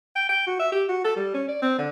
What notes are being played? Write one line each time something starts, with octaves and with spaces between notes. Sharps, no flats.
G5
G5
F#4
E5
G4
F#4
A4
G3
C#4
D5
C4
D3